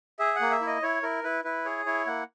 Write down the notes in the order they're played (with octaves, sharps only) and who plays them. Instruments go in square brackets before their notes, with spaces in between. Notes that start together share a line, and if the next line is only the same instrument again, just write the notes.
[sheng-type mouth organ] G#4 E5
F#5
A#3
E5
E4
D#5
E4 C#5
E4 A#4
E4 B4
E4 B4
G#4 C#5
E4 C#5
A#3 F#5